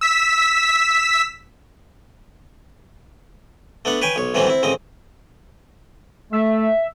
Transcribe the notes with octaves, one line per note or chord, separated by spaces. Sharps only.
E6 B6
A3 B3 D4 F#5
B4 C#5 G5 G#5
B1 C#5
A2 E3 F#3 G3 C4 C#4
C4 E4
A1 C#3 C4 D#5
A3 E5